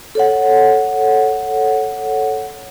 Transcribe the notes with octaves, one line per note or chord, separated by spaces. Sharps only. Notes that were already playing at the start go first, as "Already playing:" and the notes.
A4 C#5 F#5